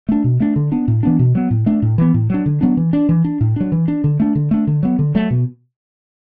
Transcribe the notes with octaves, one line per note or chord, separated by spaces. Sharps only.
A3 D4
B2
A3 D4
D3
B3 D4
A2
E3 B3 D4
B2
F#3 B3
A2
A3 D4
A2
E3 B3
A2
F#3 D4
D3
F#3 B3 D4
E3
D4
E3
D4
A2
F#3 D4
E3
D4
D3
A3 D4
D3
A3 D4
D3
F#3 B3
D3
F#3 A3
B2